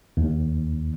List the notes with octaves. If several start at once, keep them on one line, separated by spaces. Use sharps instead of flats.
D#2